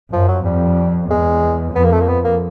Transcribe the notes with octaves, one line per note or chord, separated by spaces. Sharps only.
F#2 F3
F#3
F2 G3
E2 G#3
F2 B3
A#3
A3
A#3
B3
A#3